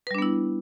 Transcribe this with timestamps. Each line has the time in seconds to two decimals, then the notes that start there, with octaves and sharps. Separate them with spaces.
0.07 B4
0.11 G3
0.15 D4
0.18 B3
0.22 E4